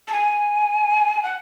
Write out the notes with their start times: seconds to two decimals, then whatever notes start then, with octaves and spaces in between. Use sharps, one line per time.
0.08 A5
0.12 G#5
1.23 F#5